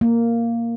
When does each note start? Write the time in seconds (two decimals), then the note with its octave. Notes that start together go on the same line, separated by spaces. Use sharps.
0.01 A#3